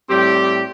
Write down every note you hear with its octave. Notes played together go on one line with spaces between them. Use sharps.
A2 G3 C4 G4